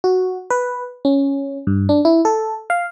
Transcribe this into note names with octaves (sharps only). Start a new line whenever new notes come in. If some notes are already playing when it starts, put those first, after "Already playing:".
F#4
B4
C#4
G2
D4
E4
A4
F5